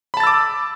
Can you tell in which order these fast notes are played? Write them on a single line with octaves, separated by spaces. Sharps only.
B5 A5 A6 E6 D6